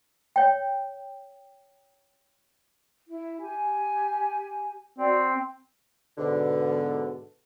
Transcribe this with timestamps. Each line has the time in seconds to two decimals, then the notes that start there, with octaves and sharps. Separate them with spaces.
0.36 C#5 G5
3.09 E4
3.41 G4 G#5
4.99 C4 F#4 D5
6.18 G#2 B2 D3